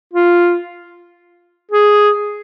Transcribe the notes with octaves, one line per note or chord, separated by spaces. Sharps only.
F4
G#4